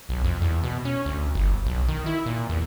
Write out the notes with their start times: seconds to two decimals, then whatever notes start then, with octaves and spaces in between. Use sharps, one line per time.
0.09 B1
0.24 F2
0.42 E2
0.63 B2
0.85 C#4
1.05 D2
1.35 G1
1.66 B1
1.88 D#3
2.06 E4
2.26 A#2
2.49 E2